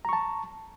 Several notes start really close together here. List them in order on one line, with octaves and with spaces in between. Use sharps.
A#5 C#6 A5